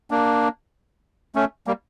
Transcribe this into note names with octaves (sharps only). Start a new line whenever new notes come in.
A#3 D4
A3 C#4
G3 A#3